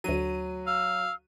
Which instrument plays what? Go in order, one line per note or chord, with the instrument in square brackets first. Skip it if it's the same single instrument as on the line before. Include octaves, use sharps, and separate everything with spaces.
[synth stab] D2 D#7 [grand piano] F#3
[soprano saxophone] F5 [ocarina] E6